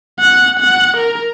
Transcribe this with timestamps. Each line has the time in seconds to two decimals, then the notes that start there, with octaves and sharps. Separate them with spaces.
0.19 F#5
0.60 F#5
0.97 A#4